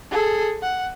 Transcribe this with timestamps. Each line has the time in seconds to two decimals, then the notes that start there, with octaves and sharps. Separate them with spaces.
0.11 G#4 A4
0.62 F#5